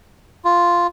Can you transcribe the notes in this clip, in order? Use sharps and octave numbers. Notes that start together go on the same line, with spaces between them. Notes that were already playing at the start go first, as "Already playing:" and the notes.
F4